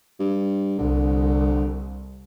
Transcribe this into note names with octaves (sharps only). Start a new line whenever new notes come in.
G2
C2 D3